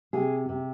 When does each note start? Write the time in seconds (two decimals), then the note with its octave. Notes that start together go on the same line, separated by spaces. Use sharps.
0.13 C3 G#4
0.49 C3